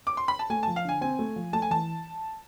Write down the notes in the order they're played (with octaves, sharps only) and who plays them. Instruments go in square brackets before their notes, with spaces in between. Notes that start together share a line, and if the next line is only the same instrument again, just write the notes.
[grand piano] D6
C6
B5
A5
[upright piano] A3 [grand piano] G#5
[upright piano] F3 [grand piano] A5
[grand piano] F5
[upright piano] D3 [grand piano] G#5
[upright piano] C4 [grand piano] G#5
[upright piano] A3
F3
[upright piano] A3 [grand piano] A5
[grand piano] G#5
[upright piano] E3 [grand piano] A5